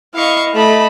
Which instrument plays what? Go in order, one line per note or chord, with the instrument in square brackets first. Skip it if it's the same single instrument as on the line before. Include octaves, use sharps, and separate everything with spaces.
[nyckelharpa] E4 D#5 [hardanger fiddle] F5 C#6
[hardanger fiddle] A3 B5 [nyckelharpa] D#5 A5